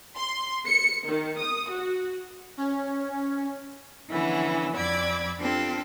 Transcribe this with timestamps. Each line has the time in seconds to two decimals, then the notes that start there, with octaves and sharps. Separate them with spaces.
0.16 C6
0.67 C#7
1.08 D#3
1.41 D#6
1.71 F#4
2.57 C#4
4.10 D3 E3 F3 B3 C#4 E4
4.75 F2 D5 B5 D6 E6 G#6
5.39 C4 D4 F4 G4 A4